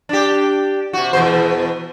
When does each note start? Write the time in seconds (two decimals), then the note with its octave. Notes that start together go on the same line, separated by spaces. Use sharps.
0.09 D4 G4
0.93 C3 F#4
1.13 E2 B2 C5